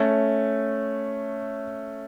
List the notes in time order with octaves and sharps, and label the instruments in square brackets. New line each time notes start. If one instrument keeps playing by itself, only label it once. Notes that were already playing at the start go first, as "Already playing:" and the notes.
Already playing: [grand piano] A3 C#4